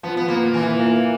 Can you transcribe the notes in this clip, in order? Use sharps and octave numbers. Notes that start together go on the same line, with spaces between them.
F3 B3
B3
A#2 A#3
A#2 E3
A#3